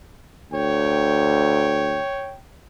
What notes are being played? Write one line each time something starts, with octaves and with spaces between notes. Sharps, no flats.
D2 C#5 G5